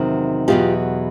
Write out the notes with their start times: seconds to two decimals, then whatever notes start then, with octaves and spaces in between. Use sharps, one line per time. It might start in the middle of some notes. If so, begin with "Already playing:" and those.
Already playing: E2 C3 D#3 F#3
0.48 E2 B2 F#3 F4 G4